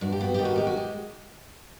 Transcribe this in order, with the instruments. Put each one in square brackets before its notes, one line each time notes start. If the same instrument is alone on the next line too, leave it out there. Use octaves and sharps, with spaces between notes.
[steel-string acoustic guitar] G2 F#4
G4
B3 F#4
D#3 G4
F#4
G#3 G4
F#4
G4